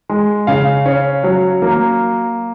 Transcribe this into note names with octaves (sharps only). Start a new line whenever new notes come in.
G#3
C#3 F5
C#4
F#3
A#3